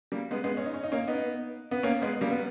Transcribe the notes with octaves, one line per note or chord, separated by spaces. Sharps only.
G3 A#3
G#3 B3
G#3 B3
C#4
D#4
C#4
D#4
A#3 C#4
B3 D#4
B3
A#3 C#4
G#3 B3
G3 A#3
B3